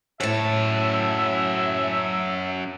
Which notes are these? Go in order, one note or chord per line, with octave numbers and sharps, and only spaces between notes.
F#2 A2 C#5 E5 A5